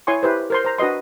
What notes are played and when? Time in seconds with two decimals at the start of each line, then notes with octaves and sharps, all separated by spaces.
0.07 E4 C#5 G#5 C6 C#6
0.23 E4 G4 B4 C5
0.50 A#4 C5 C6
0.65 C5 A#5
0.78 D4 F#4 B4 D#5 C6